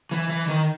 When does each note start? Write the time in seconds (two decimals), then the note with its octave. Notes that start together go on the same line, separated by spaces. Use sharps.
0.11 E3
0.30 E3
0.48 D#3